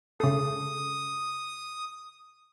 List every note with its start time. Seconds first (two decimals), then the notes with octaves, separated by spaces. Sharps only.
0.20 C#3 A4 D#6